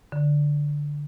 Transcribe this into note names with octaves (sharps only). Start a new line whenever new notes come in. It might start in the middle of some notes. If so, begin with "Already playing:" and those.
D3